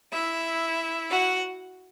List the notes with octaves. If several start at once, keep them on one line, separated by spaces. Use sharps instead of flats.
E4 E5
F#4 F#5